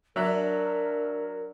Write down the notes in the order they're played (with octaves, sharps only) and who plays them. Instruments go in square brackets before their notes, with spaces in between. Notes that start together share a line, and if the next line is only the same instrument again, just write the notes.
[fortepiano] F#3 E5 F#6 [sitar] D4 [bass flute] A#4